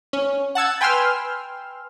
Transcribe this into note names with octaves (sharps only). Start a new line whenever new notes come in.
C#4
F#5 A5 E6 G#6
B4 G5 G#5 C6 E6 F6